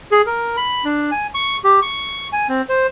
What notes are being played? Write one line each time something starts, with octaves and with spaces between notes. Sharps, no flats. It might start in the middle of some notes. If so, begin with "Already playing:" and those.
G#4
A#4
B5
D4
G#5
C#6
G4
C#6
G#5
C4
C5